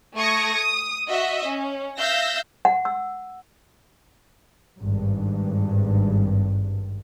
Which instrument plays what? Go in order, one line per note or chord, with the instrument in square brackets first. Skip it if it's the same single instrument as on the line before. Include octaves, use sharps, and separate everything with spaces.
[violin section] A3 C#6 D#6 G#6 A#6
D#6
F#4 D#5 E5
C#4
E5 F5 E6 G6 A#6
[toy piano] F#5
E6
[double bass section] G#1 G2